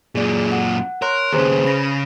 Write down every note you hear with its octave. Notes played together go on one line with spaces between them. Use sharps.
F#2 A#2 G#4 D5
F#5
A#4 C#5 C6 F#6
D#2 C#3 G#4 B4 C5
C#3 B5 A#6